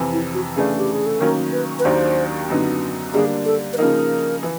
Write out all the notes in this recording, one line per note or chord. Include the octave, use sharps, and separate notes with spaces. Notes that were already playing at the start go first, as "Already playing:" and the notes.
Already playing: F2 C3 E3
E4
F#4
C#3 E3 A3 D4 G#4
G4
G#4
A4
D#3 F#3 A#3 C#4 A#4
B4
B4
D#2 D#3 F#3 A#3 D4 C5
F#2 D3 F#3 B3 D#4
D3 G3 A#3 D4 G#4
A4
B4
C#3 F3 A#3 D#4 A#4
E3